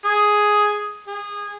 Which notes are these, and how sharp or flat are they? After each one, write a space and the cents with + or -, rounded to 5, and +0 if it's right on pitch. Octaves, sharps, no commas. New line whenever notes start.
G#4 +5
G#4 -20